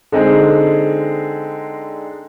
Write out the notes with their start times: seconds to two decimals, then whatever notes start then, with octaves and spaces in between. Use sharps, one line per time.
0.12 D3 G#3 C4 D#4 G#4